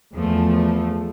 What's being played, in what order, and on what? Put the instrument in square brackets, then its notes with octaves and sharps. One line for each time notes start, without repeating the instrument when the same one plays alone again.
[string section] E2 F3 A3